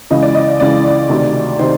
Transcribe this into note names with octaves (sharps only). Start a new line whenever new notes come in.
C#2 C#3 E3 D#5
D5
D#5
C#2 C#3 E3 D5
D2 C3 D#3
C3 D#3 C5